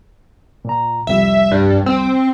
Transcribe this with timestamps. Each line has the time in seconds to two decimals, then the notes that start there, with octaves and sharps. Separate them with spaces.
0.65 A#2 A#5
1.07 C2 F2 G3 E5
1.51 G2
1.86 C4